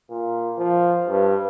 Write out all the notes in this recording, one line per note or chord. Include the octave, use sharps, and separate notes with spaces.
A#2
F3
G2